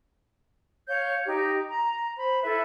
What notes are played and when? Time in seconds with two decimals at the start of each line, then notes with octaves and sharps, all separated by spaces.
0.87 C#5 F5 G6
1.26 D#4 G4
1.67 A#5
2.17 C5 B5
2.43 E4 A4 B4 E5